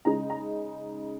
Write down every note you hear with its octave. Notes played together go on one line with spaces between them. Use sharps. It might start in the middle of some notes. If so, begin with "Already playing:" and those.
C#3 G#3 D#4 A#5
A#5